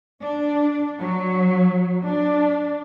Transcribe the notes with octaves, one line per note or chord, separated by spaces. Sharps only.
D4
F#3
D4